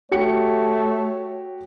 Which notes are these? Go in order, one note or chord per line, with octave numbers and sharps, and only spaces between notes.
A3 F#4 G4 C#5 C#7